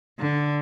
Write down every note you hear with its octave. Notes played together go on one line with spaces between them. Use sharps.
D3